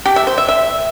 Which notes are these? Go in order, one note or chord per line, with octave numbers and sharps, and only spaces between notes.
G4
E5
C5
E5
E5